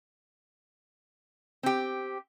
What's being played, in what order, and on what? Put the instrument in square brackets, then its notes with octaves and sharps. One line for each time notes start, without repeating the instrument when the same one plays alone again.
[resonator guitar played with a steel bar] C4 G4